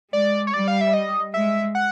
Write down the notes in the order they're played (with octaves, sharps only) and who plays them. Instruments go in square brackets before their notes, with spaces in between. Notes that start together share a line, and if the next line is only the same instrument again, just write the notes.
[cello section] G#3 [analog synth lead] D5
[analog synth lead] C#5
[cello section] G3 [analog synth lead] D5
[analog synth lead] F5
E5
D#5
[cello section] G#3 [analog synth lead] E5
[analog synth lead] F#5